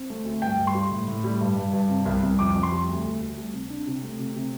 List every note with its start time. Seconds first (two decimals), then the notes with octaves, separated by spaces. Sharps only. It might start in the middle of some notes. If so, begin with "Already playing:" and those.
Already playing: C4
0.10 A3
0.25 D2
0.42 G2 G5
0.59 G2
0.67 C6
0.75 G3
0.91 A2
1.08 A2
1.24 G3
1.41 G2
1.57 G2
1.73 G2
1.89 C3
2.06 C2
2.23 C2
2.39 F2 D6
2.55 F2
2.63 C6
2.72 G3
2.89 D2
3.04 D2
3.21 D2
3.37 G3
3.54 C3
3.70 D4
3.87 C3
4.03 A3
4.19 C3
4.36 C3